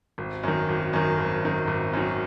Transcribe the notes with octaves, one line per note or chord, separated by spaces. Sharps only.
G#1
F#2 D#3
G#1
F#2 D#3
G#1
F#2 D#3
G#1
F#2 D#3